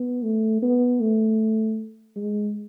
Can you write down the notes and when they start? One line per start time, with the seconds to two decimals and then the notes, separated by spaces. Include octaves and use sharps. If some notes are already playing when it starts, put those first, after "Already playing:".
Already playing: B3
0.24 A3
0.62 B3
1.01 A3
2.16 G#3